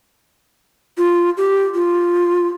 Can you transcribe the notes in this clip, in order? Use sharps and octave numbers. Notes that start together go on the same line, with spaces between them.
F4
G4
F4